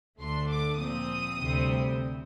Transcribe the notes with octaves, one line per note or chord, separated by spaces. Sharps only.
D2 D3 A3 D4 C6
D6
A#2 F3 C4 D#6
D2 C3 G3 C4